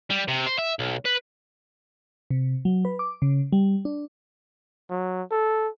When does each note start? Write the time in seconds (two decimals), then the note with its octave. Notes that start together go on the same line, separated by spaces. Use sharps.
0.10 G3
0.28 C3
0.46 C5
0.58 E5
0.79 B1
1.05 B4
2.30 C3
2.65 F#3
2.85 B4
2.99 D6
3.22 C#3
3.53 G3
3.85 D4
4.90 F#3
5.31 A4